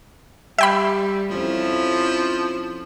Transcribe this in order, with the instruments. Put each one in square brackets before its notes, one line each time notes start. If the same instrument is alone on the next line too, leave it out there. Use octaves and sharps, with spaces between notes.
[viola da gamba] G3 [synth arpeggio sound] E5 G5 B5
[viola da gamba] F2 C#4 E4 [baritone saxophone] F3